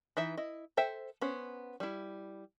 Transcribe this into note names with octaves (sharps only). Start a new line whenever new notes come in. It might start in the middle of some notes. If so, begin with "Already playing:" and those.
E3 D#4 E5
E4 D#5
A4 C5 E5 G5
B3 C#4 C5
G3 E4